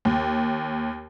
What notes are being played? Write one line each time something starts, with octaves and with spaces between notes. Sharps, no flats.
D#2